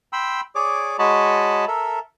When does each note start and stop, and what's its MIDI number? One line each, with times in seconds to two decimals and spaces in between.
0.13 0.41 79
0.13 0.41 83
0.13 0.41 84
0.13 0.41 88
0.55 0.97 68
0.55 0.97 73
0.55 0.97 74
0.55 0.97 86
0.99 1.65 56
0.99 1.65 66
0.99 1.65 73
0.99 1.65 75
0.99 1.65 81
0.99 1.65 83
1.68 1.99 69
1.68 1.99 70
1.68 1.99 76